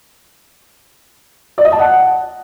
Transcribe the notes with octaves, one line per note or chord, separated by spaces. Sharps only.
D5
D#5
A5
F#5